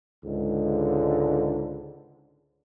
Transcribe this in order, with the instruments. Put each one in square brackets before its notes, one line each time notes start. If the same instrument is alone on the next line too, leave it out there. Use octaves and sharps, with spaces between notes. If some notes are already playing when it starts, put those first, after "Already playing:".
[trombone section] C#2 G#2 D3